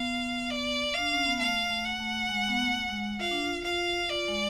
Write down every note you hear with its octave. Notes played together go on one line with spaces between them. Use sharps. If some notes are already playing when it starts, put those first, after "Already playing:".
Already playing: B3 F5
D5
D4 F5
C#4
B3
A3 F5
A3
F#5
A3
G#3
B3
A3
G#3
F4 F5
D4
F4
F4 F5
F4 D5
G#3